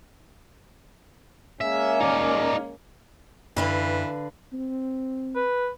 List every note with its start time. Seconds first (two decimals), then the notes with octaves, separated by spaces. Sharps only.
1.61 G#3 A#3 C#4 E5
2.00 D#4 D5
3.57 F#2 D3 E3 B4 F5
4.53 C4
5.35 B4